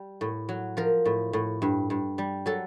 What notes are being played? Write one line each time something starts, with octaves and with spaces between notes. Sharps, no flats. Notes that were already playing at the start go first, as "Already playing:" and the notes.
Already playing: G3
A2
F#3
F3 A#4
A2
A2
G2
G2
G3
F#3 A4